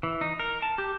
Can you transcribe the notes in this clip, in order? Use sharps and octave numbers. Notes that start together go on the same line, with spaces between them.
E3
D#4
A#4
A5
G4